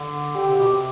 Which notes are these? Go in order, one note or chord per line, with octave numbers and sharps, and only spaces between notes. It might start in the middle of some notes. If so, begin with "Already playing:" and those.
Already playing: D3
D3 G4
C3
B2
C3